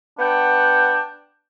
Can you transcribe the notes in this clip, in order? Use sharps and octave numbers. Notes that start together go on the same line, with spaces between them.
B3 D4 F#5 G5